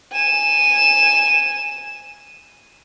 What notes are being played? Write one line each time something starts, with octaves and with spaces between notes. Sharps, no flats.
G#5 E7